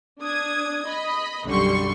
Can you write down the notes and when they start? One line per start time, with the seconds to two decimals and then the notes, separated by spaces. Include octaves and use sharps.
0.22 D4 D#6 G#6
0.87 D#5 B5
1.47 B1 F#2 D3 G3 C6 C#6